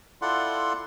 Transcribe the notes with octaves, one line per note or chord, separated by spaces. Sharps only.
E4 F4 A4 D5 F#5 C6